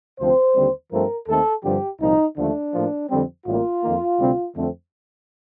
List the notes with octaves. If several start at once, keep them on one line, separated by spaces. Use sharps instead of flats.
D2 C3 F3 C4 C5
D#2 D3 G3 C4
G2 F3 A3 C4 A#4
D#2 D#3 A3 C4 A4
G2 D3 F3 C4 G4
C2 A#2 F3 D#4
D#2 D3 F3 A3 D4
A2 F3 A#3
F2 D3 G3 C4
A1 A2 G3 A#3 F4
F2 D#3 A#3
D2 C3 G3 C4
F2 D3 A3 C4